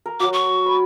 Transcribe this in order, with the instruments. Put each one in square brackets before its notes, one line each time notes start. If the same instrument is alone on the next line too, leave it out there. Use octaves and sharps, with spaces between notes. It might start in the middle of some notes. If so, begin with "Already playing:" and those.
[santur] A#4
[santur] F#3 F#4 [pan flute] D6
[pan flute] C#6
[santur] B5